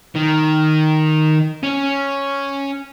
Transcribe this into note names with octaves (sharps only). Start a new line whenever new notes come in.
D#3
C#4